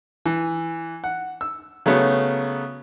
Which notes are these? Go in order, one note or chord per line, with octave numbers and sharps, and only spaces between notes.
E3
F#5
E6
C#3 F#3 A3 B3 C#4